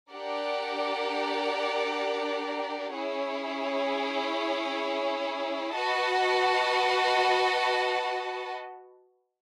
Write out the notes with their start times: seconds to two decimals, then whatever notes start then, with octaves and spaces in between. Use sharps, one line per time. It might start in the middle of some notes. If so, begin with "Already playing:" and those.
0.13 D4 G4 A#4 D5 F#5
2.93 C#4 E4 G#4 C#5
5.74 F#4 B4 D#5 F#5 A5